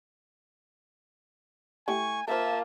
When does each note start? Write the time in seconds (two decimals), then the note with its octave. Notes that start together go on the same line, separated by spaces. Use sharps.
1.88 A3 E4 G4 G#5 C#6
2.28 A#3 F4 A#4 C5 E5 A5